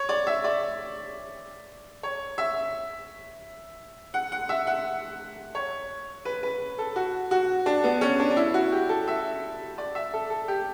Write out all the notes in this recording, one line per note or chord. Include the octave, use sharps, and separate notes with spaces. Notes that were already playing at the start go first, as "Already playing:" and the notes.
Already playing: C#5
D5
E5
D5
C#5
E5
F#5
F#5
E5
F#5
C#5
B4
B4
A4
F#4
F#4
D4
B3
C#4
D4
D4
E4
F#4
G4
A4
E5
D5
E5
A4
A4
G4